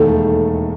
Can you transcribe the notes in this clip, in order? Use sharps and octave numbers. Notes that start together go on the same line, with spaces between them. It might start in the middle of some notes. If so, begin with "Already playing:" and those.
Already playing: E1 D#2 D#3 A3 A4